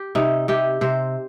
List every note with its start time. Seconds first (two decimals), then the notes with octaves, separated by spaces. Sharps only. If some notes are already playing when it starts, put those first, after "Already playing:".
Already playing: G4
0.15 C3 D#4
0.48 C3 G4
0.81 C3 C5